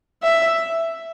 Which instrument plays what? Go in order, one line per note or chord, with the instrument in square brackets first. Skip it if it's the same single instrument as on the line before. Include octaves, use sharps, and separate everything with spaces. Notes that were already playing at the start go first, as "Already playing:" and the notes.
[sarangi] E5